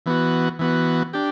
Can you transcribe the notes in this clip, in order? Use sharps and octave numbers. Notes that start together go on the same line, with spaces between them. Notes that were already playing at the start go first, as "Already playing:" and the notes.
E3 B3 F#4
E3 B3 F#4
D4 G4